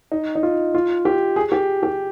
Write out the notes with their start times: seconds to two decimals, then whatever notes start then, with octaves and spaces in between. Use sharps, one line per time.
0.12 D#4
0.35 D#4
0.43 F4
0.74 F4
1.05 G4
1.36 G#4
1.52 G4
1.83 G4